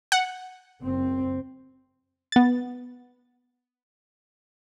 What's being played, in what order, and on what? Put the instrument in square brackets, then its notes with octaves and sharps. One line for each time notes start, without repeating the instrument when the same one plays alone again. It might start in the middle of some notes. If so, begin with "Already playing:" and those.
[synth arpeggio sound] F#5
[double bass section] F#1 C4
[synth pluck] B3 A6